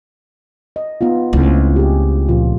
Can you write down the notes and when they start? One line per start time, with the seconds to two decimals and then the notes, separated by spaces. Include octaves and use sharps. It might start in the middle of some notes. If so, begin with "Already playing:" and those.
0.76 D#5
1.01 B3 D#4 F4
1.33 C#2 A3 C4 E4
1.76 G4 G#4
2.29 A#2 F3 F4